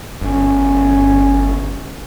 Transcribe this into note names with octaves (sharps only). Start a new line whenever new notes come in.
G1 C#4